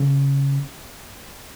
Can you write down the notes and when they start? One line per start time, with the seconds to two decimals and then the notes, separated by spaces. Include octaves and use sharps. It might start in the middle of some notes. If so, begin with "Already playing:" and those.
Already playing: C#3